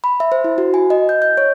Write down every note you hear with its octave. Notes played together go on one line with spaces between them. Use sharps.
B5
E5
C5
E4
F#4
G#5
D#5
G6
G6
C#5